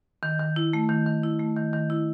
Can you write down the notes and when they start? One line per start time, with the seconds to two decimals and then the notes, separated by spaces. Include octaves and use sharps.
0.23 D#3
0.40 D#3
0.56 E4
0.73 A3
0.89 D#3
1.06 D#3
1.24 E4
1.40 A3
1.57 D#3
1.73 D#3
1.90 E4